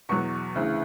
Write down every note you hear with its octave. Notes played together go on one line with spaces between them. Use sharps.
E2 B2 F#3 C#6
D2 C#3 E3